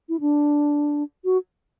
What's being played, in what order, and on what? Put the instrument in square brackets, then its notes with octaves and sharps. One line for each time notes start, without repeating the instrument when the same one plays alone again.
[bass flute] E4
D4
F#4